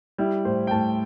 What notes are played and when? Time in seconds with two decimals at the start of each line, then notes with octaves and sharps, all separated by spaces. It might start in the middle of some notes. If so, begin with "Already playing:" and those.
0.18 G3 E4
0.45 A2 C5
0.67 G5
0.71 A2 A5